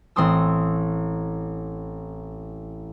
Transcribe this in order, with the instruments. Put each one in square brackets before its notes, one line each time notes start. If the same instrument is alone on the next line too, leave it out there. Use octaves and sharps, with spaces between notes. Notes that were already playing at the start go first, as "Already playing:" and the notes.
[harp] A1 C4 C6 D#6 E6